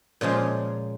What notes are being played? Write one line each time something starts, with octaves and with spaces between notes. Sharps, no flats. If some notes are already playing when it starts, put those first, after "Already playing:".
A#2 C#3 F3 G#3